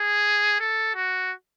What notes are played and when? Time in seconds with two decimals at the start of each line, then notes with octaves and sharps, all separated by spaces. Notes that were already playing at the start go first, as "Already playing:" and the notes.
Already playing: G#4
0.60 A4
0.95 F#4